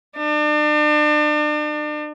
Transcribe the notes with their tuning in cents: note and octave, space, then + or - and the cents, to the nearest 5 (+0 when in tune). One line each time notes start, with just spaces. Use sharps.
D4 +40